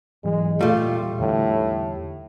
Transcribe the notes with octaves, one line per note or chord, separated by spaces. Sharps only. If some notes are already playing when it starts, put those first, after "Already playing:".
G#2 E3 F#3 G#3
E1 A#2 G3 A3 F4
E2 A2 D3